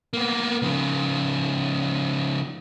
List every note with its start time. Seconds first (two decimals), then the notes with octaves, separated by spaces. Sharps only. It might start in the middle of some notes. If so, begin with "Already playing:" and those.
0.13 A#3 B3
0.62 C#3 F3